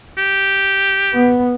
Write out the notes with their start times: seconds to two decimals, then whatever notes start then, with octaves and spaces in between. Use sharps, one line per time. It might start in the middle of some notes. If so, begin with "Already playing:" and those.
0.18 G4
1.14 B3